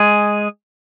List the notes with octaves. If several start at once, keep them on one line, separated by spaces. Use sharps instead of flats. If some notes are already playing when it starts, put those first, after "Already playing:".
Already playing: G#3 G#4